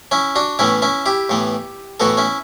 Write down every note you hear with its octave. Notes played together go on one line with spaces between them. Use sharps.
C#4 E4
D4 F#4
A2 E3 B3 C#4 E4
C#4 E4
E4 G4
A2 E3 B3
A2 E3 B3 F#4 A4
C#4 E4